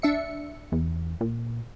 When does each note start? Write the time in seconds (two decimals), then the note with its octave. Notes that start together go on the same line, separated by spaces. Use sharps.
0.02 D4 E5 C#7
0.72 E2
1.21 A#2